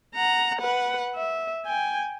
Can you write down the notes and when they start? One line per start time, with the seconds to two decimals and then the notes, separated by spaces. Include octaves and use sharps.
0.15 F#5 A#5
0.59 B4 F#5
1.16 E5
1.66 G5 G#5